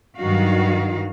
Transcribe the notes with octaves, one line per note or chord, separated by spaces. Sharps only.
G2 D#3 F#3 F#4 F5